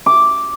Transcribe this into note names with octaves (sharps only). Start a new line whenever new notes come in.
D6